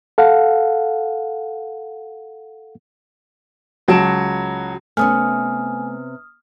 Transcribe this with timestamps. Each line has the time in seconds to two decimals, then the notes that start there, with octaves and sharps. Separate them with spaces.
0.18 A4 F5 F#5
3.88 C#2 F#3 A5 D7 E7
4.97 C3 A3 B3 C#4 G#5 D#6 F6